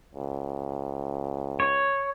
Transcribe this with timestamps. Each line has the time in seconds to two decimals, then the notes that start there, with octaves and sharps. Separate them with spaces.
0.15 C#2
1.60 C#5